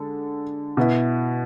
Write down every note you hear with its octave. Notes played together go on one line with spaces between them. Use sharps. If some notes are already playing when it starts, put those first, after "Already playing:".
Already playing: D3 G#3 A4
B2 B3 E4